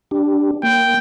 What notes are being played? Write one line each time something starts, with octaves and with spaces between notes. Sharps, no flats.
D4 G4
A#3 G5